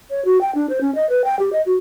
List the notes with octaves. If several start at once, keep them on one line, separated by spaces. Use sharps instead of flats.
C#5
F#4
G5
D4
C5
C#4
D#5
B4
G5
G4
D#5
F#4